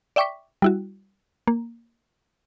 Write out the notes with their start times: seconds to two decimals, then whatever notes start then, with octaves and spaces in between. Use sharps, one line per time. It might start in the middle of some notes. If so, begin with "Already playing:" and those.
0.16 D5 E5 G5 C#6 D6 B6
0.62 G3 E4 F#4
1.47 A#3